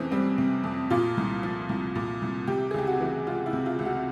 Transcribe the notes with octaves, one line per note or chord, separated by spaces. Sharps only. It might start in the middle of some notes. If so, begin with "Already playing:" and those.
Already playing: F2 C3 E3 C4 C#4
G3 C4
C3
F2
A#2 F4
C2
F3
C2
A#2
C2
C3 G4
G#4
C#2 G4
F#4
E3
G#3 F4
E4
C3
F4
C#2
F#4